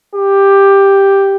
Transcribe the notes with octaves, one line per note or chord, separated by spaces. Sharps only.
G4